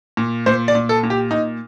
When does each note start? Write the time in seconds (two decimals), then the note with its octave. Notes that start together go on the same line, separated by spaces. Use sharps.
0.17 A#2
0.46 A#2 C5
0.68 D5
0.75 A#2
0.89 A4
1.03 A#2
1.10 G4
1.31 A#2 D#4